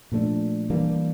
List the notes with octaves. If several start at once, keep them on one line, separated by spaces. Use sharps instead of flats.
A#2 F3 A3 D4
E3 G3 A#3 D4